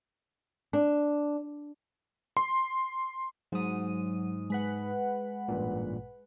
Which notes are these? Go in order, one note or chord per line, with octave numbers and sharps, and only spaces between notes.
D4
C6
G#2 F#3 D#6 D#7
G#3 B4 F#5
A1 G2 A#2